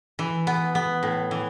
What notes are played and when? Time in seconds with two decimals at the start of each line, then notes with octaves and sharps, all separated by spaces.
0.19 E3
0.47 B3
0.75 B3
1.03 A2
1.31 E3